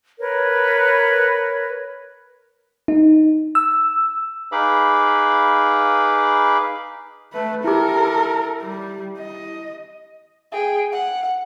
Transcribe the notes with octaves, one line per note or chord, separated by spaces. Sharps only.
A#4 B4 C#5
D#4
E6
D#4 G#4 B4 F5 B5 D6
A3 B4
E4 G4 A4 A#4
G3
D#5
G#4 G5
F#5